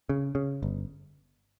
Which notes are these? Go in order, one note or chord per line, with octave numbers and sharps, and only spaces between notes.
C#3
C#3
G1